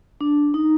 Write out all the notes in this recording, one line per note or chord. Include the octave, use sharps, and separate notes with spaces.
D4
D#4